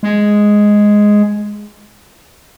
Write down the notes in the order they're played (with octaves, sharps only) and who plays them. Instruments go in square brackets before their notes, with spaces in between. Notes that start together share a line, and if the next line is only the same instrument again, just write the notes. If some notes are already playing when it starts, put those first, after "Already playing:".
[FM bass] G#3